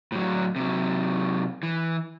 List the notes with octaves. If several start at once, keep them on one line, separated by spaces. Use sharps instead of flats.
A2 F#3
C3 F#3
E3